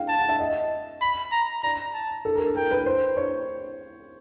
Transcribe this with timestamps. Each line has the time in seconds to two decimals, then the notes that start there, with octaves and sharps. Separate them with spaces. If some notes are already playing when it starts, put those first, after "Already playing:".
Already playing: F5 G5
0.09 A5
0.19 F#5
0.29 E5
0.39 D#5
1.01 B5
1.32 A#5
1.63 D5 A#5
1.94 A5
2.25 A4
2.35 A#4
2.40 A4
2.55 A#4 G5
2.71 B4
2.86 C5
3.17 C#5